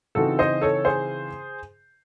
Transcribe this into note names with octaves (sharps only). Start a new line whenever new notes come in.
C#3 E3 C4 D#4 F#4 A4
C5 D#5
A4 C#5
G#4 C5